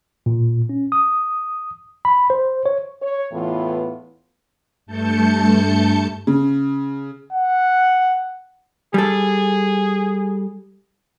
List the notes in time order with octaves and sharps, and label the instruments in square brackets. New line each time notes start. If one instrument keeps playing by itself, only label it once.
[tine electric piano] A#2
C#4
D#6
B5
C5
C#5
[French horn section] C#5
E2 A2 E3 B3 F4
[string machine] G2 A3 A5 G6 C#7
[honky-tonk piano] C#3
[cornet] F#5
[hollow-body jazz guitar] G3 A4 [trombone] G#4